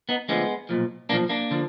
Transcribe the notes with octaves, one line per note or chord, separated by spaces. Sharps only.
B3 D#4
D2 D3 F3 G#3 B3
B1 A#2 F3
B1 A#2 F3 A#3 D4
A#3 D4
D3 F3